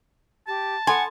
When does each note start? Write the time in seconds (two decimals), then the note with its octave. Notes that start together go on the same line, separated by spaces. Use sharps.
0.47 G4 A5
0.87 A4 F#5 G#5 B5 C6